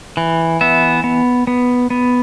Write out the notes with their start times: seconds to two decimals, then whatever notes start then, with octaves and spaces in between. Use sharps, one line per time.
0.17 E3
0.61 B3 E5
1.04 B3
1.47 B3
1.90 B3